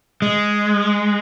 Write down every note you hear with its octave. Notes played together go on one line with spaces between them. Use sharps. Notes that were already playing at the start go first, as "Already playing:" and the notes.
G#3